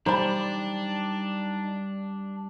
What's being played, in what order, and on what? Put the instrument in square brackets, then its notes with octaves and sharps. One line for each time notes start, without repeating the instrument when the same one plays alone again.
[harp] G3 [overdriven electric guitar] D4 [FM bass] D#4 [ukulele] C5 B5